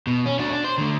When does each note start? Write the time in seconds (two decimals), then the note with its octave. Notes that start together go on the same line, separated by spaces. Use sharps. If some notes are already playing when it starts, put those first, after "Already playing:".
0.07 B2
0.26 C#4
0.39 D4 F#4
0.52 D4
0.64 C5
0.78 D3 A3